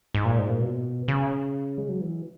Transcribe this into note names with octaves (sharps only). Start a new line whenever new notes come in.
G#2
A#2
G#2
A#2
B2
C#3
G#3
F#3
E3